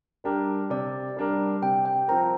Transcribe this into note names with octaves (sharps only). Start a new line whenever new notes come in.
G3 D4 G4 A#4
C3 D5
G3 D4 A#4
C3 G5
G5
F3 C4 A#4 A#5